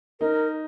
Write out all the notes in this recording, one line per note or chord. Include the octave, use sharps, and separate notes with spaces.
D#4 A#4